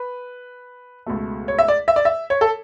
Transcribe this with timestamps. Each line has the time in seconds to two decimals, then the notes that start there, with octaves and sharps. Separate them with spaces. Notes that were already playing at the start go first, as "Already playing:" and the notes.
Already playing: B4
1.06 C#2 B2 A3
1.48 C#5
1.58 E5
1.68 D5
1.88 E5
1.96 D5
2.05 E5
2.30 C#5
2.41 A4